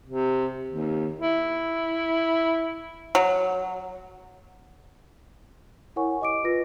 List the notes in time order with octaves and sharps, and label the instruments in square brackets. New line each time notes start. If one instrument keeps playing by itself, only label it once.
[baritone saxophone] C3
D#2
E4
[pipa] F#3
[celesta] E4 A#4 C#5 F#5 G#5 C#6
G4 D#5 D6 D7
F4 B4 A#6